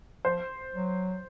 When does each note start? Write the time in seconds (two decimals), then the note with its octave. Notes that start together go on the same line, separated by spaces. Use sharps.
0.25 F3 C5
0.75 F#3